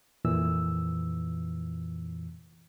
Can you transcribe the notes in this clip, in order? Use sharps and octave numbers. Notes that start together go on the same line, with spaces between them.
F2 A#2 E3 E6